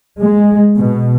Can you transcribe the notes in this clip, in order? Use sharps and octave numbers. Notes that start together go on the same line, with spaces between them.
G#3
B2